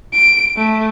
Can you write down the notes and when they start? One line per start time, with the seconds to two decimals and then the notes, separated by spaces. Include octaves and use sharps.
0.14 D7
0.57 A3